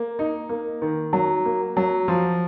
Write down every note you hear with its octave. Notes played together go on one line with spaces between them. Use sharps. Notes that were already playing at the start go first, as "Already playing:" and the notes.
Already playing: A#3
D#4
A#3
D#3
F#3
A#3
F#3
F3